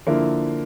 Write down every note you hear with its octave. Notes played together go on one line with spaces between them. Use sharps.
D3 F3 A#3 E4